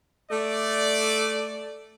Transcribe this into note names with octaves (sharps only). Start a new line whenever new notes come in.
A3 D5